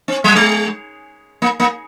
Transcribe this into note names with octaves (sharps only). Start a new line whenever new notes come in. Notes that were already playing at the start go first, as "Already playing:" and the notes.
C4
G3
G#3
A#3
A#3